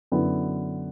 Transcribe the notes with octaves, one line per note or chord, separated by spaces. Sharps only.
F#2 D3 F#3 B3 E4